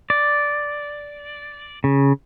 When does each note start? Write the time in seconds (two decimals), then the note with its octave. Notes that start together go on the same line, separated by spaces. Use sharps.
0.10 D5
1.84 C#3